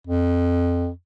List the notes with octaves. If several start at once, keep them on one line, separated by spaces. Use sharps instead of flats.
F2